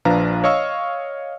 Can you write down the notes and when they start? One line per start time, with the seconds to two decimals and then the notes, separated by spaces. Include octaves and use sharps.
0.05 A#1 F3 D4 B4 F5 A#5
0.44 C#5 D#5 F5 C#6 E6